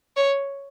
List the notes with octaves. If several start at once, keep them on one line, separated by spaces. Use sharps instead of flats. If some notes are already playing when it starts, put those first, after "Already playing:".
C#5